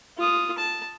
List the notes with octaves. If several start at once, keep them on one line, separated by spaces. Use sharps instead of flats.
F4 D#6
A5